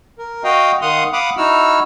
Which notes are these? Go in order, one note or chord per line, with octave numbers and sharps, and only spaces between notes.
A#4
F#4 D#5 F5 G5
D#3 F5 F#5 C6 D#6
F5 F#5 B5 D6 D#6
D#4 E4 F#4 E6 F6